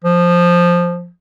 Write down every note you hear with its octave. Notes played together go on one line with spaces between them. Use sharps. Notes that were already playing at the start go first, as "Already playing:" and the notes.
F3